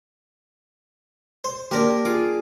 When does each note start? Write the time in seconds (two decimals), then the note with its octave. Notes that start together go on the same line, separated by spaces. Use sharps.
1.44 C5
1.71 A#3 D4 G4 A#4
2.05 F4 G#4 D6